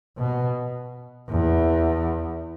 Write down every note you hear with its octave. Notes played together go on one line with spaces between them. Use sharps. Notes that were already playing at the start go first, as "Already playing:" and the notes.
B2
E2